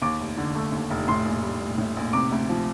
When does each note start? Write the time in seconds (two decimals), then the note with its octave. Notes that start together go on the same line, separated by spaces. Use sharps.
0.02 D#2 D6
0.20 F1
0.38 D3
0.55 A3
0.72 D#2
0.90 F1
1.08 A2 C6
1.25 A#1
1.43 G3
1.61 A#1
1.78 A2
1.96 A#1
2.13 C3 D6
2.32 D2
2.49 F3